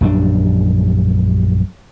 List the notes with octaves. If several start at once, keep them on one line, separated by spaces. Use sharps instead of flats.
A#1 F#2 G3 D4